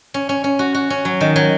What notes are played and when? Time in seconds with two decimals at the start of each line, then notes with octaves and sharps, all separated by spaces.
0.14 C#4
0.29 C#4
0.44 C#4
0.59 F#4
0.74 F#4
0.90 C#4
1.05 F#3
1.21 D#3
1.36 F#3